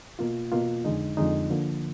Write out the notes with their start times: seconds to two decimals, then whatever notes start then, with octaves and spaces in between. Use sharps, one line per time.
0.19 B2 A#3 F4
0.52 B2 A#3 F4
0.85 F2 D3 G#3 D#4
1.17 F2 D3 G#3 D#4
1.50 D3 F3 A#3